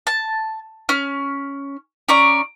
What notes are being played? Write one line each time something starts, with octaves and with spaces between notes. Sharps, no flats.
A5
C#4 F6
C#4 D5 A#5 C#6